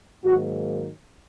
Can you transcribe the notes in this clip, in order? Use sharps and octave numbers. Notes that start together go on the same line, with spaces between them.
G#2 D#3 F#3 A#3 F#4